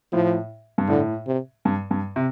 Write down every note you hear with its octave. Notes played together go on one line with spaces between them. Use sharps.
A2 F3
G2
A2 D3
C3
G2
G2
C3